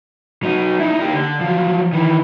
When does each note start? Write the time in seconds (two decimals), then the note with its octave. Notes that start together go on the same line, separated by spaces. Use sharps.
0.43 F#3 D#4
0.80 D#4 E4
1.00 D#4 G4
1.13 D3
1.41 F3 F#3
1.93 D#3 E3